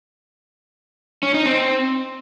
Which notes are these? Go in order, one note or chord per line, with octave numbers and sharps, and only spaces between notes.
C#4
D#4
C4